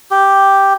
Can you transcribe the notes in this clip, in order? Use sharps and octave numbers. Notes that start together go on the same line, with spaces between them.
G4